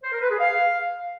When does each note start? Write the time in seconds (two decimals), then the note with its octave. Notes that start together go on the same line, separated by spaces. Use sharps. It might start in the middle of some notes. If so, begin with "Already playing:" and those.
0.03 C5
0.12 A#4
0.21 B4
0.31 G#4
0.40 F5